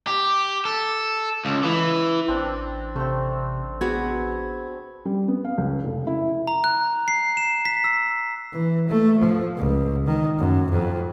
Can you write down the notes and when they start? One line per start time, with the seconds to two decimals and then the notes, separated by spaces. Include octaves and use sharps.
0.07 G4
0.65 A4
1.45 C#2
1.63 E3
2.28 A1 C4 D4
2.96 C3 A3 C4
3.81 B3 F#4 G#4 B5 G#6
5.05 G3
5.28 B3
5.44 F5
5.58 C#2
5.84 F1
6.07 E4
6.47 A#5
6.64 F#6
7.08 C7
7.37 E7
7.65 B6
7.84 E6
8.53 E3
8.88 A3
9.18 F3
9.58 C#2
10.07 D#3
10.39 F#2
10.71 F2